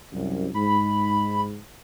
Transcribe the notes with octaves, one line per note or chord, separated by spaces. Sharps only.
C2 F#2
G#2 B5